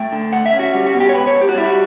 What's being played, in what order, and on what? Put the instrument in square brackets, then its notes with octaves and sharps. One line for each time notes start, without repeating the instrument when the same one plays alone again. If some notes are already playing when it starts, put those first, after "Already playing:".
Already playing: [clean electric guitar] A3 G5
D3
D2 F#5
E5
C#4
F#4
G3 F#4
F#4
B2
G4
C#5
C#2 B4
C#5
C#2
G4
F#4
G3 E4
F#4